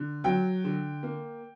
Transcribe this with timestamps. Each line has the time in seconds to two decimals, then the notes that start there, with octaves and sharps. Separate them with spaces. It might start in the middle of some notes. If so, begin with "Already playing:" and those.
Already playing: D3
0.24 F#3 G5
0.64 D3
1.03 A#3